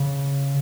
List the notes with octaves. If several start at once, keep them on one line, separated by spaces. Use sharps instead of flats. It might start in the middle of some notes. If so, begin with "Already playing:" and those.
Already playing: C#3